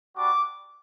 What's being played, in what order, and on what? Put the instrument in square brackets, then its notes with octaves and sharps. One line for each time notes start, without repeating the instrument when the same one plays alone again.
[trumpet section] G3 D4 F#4 D6